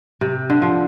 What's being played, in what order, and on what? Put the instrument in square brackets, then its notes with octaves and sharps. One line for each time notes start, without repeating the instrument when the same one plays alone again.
[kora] C3
D3
F3